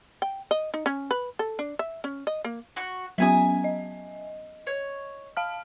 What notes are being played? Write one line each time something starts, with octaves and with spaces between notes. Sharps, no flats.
G5
D#5
D#4
C#4
B4
A4
D4
E5
C#4
D#5
A#3
F#4 C#6
F#3 B3 C#4 E5 G#5 D#6
D#5
C#5
F5 A5 F6